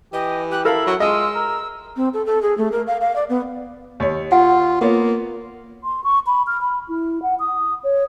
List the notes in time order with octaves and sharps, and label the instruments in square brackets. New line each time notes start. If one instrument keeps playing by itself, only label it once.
[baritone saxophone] E3 [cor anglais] G4 [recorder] D#5
[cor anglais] G4 [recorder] F#6
[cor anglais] E4 [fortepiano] A4 A#4 F5 [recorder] B5
[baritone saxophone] F#3 [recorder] F#5
[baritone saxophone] G#3 [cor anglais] F4 [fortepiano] D#5 [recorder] E6
[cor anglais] A#4
[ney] C4
A4
A4
G#4
A3
A#4
F5
F5
D5
B3
[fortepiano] D#2 C#5
[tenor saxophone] F4 [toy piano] F#5
[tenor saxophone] A#3 [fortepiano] B3 F4 C#5
[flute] C6
C#6
B5
F6
B5
E4
F#5
D#6
C#5